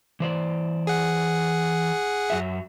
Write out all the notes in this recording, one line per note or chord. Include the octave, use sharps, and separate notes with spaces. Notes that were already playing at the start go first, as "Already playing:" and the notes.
E3 C5 D5
G#4 F#5
F#2 F#3 E5